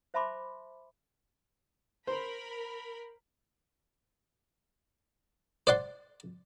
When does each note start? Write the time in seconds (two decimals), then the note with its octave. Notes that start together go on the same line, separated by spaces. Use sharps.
0.14 C5 E5 A5 B5 C6 D6
2.07 A#4 C5 B5
5.67 C5 D5 F#5 C6